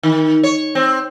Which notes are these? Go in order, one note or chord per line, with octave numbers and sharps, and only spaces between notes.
D#3
C#5
C4